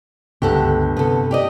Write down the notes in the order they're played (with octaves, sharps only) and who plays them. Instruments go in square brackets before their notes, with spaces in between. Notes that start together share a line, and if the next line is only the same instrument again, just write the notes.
[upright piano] G1 [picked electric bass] C#2 D3 [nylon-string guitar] G4 A4 F#5
[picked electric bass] C3 [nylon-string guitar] B3 A4
[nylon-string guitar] G4 D5 D#5